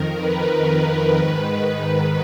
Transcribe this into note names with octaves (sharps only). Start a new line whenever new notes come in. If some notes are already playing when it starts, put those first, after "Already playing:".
Already playing: F2 D#3 A#4
B4
B4
G#2 D#3
B4